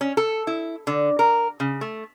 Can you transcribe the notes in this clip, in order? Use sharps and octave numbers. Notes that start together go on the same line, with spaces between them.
C#4
A4
E4
D3
A#4
C#3
A3